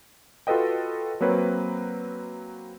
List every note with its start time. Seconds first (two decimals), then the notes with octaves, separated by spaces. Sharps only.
0.47 F4 F#4 A4 B4 D#5 G5
1.21 F#3 A#3 C4 B4 C#5